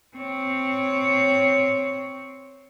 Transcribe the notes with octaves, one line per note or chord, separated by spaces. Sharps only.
C4 C#5